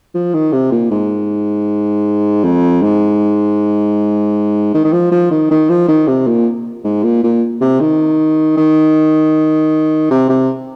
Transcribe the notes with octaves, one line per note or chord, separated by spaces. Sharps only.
F3
D#3
C3
A#2
G#2
F2
G#2
D#3
D#3
F3
F3
D#3
D#3
F3
D#3
C3
A#2
G#2
A#2
A#2
C3
D#3
D#3
C3
C3